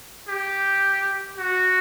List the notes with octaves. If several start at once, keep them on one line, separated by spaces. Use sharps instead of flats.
G4
F#4